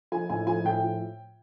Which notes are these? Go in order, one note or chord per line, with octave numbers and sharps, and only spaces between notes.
F3 G#5
A2 G#5
F3 G#5
A2 G5
F3